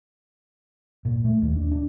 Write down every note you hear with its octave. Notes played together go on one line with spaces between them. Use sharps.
A#2
A3
D#2
D4
D4